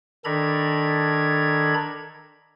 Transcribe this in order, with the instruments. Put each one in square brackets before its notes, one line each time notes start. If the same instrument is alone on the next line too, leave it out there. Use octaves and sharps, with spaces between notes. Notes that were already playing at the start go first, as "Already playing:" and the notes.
[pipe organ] D#3 D4 A4 A#5 B5 G#6